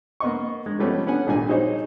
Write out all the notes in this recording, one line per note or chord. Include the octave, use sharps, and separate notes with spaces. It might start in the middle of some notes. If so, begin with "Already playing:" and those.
A#3 B3 D#5 C#6
G#3
F3 G3 A3 B3 C#4
B3 C#4 F#5 G#5
G#1 A#2 G3 G#5
D#4 F#4 G#4 C5 C#5 D#5